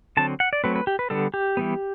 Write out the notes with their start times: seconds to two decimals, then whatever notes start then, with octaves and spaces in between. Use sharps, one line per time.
0.17 D3 F#3 C4 A5
0.40 F#5
0.53 D5
0.64 F#3 A3 C4 B4
0.76 B4
0.87 G4
0.99 B4
1.10 D3 G3 B3 A4
1.34 G4
1.57 E3 G3 B3